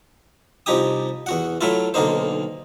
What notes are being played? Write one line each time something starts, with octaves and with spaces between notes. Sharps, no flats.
C2 F3 D#4 G4 G#5 D#6
E2 F#4 F#5
F#3 A3 E4 F4
B1 D3 A#3 D#4 C5